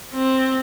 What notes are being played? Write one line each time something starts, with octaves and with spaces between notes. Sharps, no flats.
C4